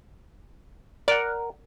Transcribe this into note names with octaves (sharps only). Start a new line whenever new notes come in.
A#4 D5 F#5